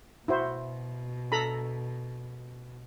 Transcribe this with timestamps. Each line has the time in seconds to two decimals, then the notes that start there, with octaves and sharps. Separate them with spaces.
0.28 B2 E4 F#4 C5
1.32 A4 A#5 B5